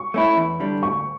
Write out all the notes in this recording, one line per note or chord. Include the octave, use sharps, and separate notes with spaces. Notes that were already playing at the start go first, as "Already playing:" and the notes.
Already playing: C#6
A3 C#4 E4
E2
D3 G3 D4
D2 C#6